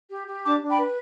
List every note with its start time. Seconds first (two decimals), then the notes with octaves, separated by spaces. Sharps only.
0.11 G4
0.27 G4
0.44 D4 A5 D6
0.61 D4
0.69 G5 B5
0.78 B4